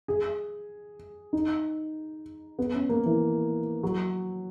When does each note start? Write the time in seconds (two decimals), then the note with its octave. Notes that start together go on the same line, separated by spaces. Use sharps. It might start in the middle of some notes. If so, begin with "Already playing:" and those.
0.08 G#4
1.33 D#4
2.59 B3
2.74 C#4
2.89 A#3
3.05 E3
3.83 F#3